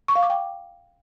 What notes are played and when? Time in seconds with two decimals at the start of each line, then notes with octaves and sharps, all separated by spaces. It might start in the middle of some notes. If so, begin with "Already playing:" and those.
0.08 C#6
0.15 F5
0.23 D6
0.30 G5